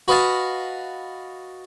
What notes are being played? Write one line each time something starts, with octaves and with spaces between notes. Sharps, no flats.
F#4 B4 D#5 F5 A5